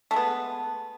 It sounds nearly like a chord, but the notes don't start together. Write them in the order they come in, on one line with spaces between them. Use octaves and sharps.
A3 G#3 B3